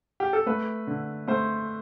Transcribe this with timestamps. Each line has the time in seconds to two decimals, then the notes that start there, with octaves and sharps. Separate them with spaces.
0.20 G4
0.33 A4
0.46 A3 B4
0.87 D3
1.28 A3 C5